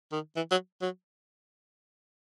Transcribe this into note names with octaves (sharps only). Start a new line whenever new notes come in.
D#3
E3
F#3
F#3